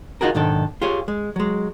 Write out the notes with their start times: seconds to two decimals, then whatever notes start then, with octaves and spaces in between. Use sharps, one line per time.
0.21 D#4 F4 F#4 G#4 A#4
0.35 B1 G#2 D#3 D4 A4
0.82 F4 G4 G#4 C#5
1.08 G#3
1.36 F#3 G#3